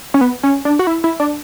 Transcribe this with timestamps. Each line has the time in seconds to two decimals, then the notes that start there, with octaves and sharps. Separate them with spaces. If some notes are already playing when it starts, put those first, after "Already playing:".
0.14 C#4
0.21 B3
0.43 C#4
0.65 D4
0.79 F#4
0.87 E4
1.04 E4
1.20 D4